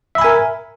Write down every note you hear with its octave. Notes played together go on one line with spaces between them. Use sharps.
A#4 E5 G#5 B5